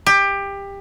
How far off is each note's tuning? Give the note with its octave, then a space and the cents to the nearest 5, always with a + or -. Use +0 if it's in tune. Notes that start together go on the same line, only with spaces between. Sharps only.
G4 +20